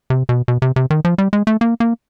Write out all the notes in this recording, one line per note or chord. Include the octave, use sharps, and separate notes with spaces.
C3
B2
B2
C3
C3
D#3
F3
G3
G#3
A3
A#3
A#3